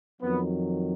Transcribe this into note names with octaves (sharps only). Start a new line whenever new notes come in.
F2 D#3 F#3 B3